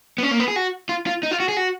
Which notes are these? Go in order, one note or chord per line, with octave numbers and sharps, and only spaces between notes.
B3
C#4
A#3
B3
G#4
F#4
F4
F4
D#4
F4
F#4
G#4
F#4